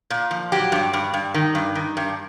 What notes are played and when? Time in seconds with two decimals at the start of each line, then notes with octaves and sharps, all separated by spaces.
0.10 A#2
0.31 F3
0.52 F#3 G4
0.72 G2
0.93 G2
1.14 G2
1.34 D#3
1.55 G2
1.75 D#3
1.97 G2